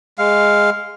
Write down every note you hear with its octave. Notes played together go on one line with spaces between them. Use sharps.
G#3 F5